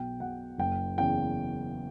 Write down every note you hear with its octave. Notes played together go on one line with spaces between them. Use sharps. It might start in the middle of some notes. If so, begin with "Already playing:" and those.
Already playing: B1 G5
B2 F#5
F#1 G5
E2 C#3 E3 G5